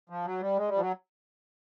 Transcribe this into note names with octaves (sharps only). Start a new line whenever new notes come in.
F3
F#3
G3
G#3
G3
F3
F#3